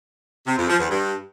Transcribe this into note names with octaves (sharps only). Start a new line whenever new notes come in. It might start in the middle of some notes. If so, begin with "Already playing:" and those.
C3
F2
F3
E2
G2